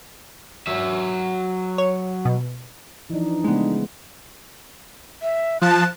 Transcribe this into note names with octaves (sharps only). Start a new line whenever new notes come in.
F#3 E5
C#5
B2
E3 F3 D4 D#4
C#3 G#3 A3 B3
E5
F3 A5 F#6